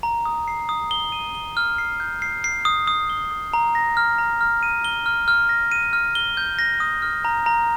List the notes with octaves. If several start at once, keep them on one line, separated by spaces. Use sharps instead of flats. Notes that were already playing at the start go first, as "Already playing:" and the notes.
A#5
D#6
C7
D#6
G7
D#7
G7
F6
C7
G6
C7
C7
D#6
D#6
G7
D#6
A#5
A#6
F6
A#5
F6
D#7
G7
F6
F6
A#6
D#7
F6
G7
G6
A#6
D#6
F6
A#5
A#5